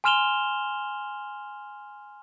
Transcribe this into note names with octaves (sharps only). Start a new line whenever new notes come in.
G#5 C6 F6 E7 F7 G7